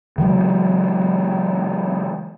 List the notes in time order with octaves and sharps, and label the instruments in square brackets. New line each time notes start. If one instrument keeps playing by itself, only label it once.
[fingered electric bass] C#3 E3 F#3 G#3